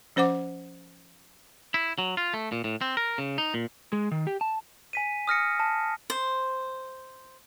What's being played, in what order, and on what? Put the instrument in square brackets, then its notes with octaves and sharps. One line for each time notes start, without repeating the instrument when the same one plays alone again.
[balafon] F3 C#4 C5 F#5 D6
[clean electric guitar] E4
F#3
F4
A3
A#2
A2
C4
A#4
C#3
D#4
A#2
[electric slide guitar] G#3
D#3
G4
A5
[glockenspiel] G#5 B6 D#7
D#6 F6 A#6 C#7
A5
[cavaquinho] C5